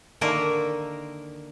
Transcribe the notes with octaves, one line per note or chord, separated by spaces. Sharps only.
D3 D#3 A#3 A#4 E5 A5